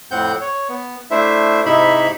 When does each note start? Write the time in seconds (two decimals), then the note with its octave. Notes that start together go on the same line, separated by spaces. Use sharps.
0.11 F2 A2 C4 F#5 G6
0.41 C#5
0.69 B3
1.11 A3 D4 E4 C5 E5
1.66 G#2 C3 D#4 E4 E5 B5